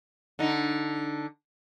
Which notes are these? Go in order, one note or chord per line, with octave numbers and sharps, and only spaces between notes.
D3 D#4